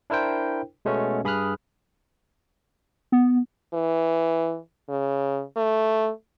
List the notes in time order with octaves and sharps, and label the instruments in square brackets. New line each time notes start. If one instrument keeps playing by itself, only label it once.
[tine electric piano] D4 E4 A#4 C5 G5
B2 G#3 A3 B3 C#4
G2 G#4 B5 D#6 F6 F#6
[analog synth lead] B3
[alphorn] E3
C#3
A3